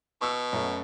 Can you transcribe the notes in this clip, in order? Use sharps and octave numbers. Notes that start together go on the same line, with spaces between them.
B2 C#6 E6
F#2 A3 C#4